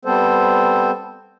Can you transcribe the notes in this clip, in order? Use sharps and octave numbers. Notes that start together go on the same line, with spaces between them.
G3 B3 C4 A4 C5